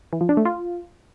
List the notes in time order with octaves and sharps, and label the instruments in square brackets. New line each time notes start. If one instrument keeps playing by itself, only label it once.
[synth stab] E3
F3
D4
A3
F4